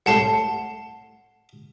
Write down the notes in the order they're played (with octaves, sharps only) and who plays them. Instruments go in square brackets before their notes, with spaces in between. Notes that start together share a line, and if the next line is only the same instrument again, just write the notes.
[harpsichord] C2 A2 C6 [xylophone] F#5 A5 C7